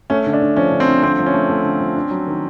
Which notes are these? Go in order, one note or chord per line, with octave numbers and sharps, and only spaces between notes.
A3 C#4
D3
D4
D3
F3 C#4
D3
C4
D3
D3 C4
F3
C#4
A3
A3
D3
F3
D4
F#3
D#3